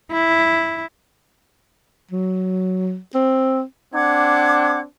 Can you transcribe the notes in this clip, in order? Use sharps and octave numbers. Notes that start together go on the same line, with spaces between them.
E4
F#3
C4
C4 D4 F#5 D6 G#6